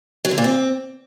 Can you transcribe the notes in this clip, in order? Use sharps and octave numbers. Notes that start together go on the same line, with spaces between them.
F#3
D3
A#2
C4